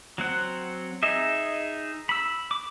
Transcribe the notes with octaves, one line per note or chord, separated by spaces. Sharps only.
F#3 C4 F#5
D#4 G#4 D#5 E5
B5 E6
D6